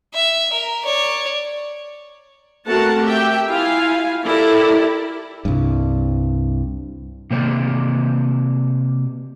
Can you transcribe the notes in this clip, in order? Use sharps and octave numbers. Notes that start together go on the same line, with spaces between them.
E5
A#4
C#5 D5
A3 C4 F#4 A#4 F#5 A5
G4 E5 G5
E4 F4 F5 G#5
E4 G4 A4 A#4 D5
C2 G2
C3 A#3 C5 D5